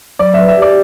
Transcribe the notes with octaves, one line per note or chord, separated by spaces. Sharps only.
F#3 D5
B4 E5
E5
G4 D5